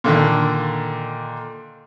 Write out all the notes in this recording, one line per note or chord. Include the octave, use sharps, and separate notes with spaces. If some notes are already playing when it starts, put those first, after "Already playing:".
A#2 D3 D#3